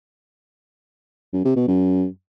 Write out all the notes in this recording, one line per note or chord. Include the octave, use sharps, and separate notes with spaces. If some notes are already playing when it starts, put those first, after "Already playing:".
F#2
C3
B2
F#2